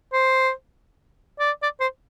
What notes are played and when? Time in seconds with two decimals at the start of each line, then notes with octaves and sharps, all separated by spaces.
0.13 C5
1.39 D5
1.63 D5
1.80 C5